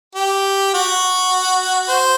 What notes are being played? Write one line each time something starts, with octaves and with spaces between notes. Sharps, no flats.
G4
F#4
C5